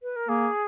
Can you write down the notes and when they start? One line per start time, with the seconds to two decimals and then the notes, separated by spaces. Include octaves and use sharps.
0.03 B4
0.16 A#4
0.29 A#3 G#4